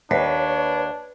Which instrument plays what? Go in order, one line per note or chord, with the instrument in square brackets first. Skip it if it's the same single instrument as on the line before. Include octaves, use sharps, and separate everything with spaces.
[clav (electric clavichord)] D#2 [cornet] D4 [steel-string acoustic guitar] B4 [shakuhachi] C#5